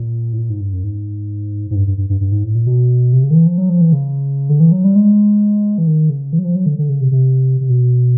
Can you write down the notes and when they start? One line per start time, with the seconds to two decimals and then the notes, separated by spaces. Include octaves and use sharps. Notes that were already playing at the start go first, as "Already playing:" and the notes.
Already playing: A#2
0.33 A2
0.38 A#2
0.50 G#2
0.61 G2
0.73 F#2
0.84 G#2
1.71 G#2
1.75 G2
1.87 G2
1.98 G2
2.10 G2
2.21 G2
2.32 G#2
2.43 A2
2.55 A#2
2.67 B2
3.13 C3
3.23 C#3
3.30 D#3
3.34 E3
3.47 F3
3.58 F#3
3.69 F3
3.81 E3
3.92 C#3
4.49 D3
4.60 E3
4.72 F#3
4.84 G3
4.96 G#3
5.78 E3
5.87 D#3
6.09 C#3
6.33 E3
6.39 F#3
6.44 F3
6.55 F#3
6.66 D3
6.78 D3
6.89 C#3
7.01 C3
7.12 C3
7.61 C3
7.69 B2